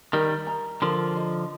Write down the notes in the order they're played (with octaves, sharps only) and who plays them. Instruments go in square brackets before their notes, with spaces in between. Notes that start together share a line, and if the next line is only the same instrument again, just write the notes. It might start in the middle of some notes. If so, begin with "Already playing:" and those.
[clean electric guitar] D#3 G3 [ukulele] A#4
[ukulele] A#5
[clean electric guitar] D3 F3 [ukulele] A#4
[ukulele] D#5